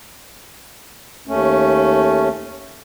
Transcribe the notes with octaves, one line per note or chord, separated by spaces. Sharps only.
D#2 A3 C#4